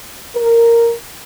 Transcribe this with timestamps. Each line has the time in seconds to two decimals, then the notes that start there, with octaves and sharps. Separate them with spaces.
0.35 A#4